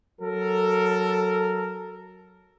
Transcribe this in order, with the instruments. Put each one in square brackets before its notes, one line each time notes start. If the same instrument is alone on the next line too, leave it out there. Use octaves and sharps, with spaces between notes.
[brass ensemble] F#3 A4 A#4